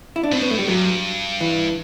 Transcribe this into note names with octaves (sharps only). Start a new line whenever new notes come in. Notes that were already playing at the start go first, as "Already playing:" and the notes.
E4
D4
A2 C4
B3
A3
G3
G2 F#3
E3